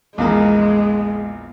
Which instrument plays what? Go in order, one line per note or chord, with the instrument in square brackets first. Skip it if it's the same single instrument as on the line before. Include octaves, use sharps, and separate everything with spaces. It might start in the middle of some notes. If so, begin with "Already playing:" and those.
[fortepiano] A#1 E2 A#3 [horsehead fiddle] G#3